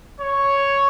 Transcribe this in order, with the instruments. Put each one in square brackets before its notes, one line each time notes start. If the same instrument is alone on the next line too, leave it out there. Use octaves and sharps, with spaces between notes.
[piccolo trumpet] C#5